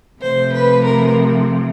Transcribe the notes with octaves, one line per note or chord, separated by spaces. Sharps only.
C3 F3 A3 C5
B4
A#4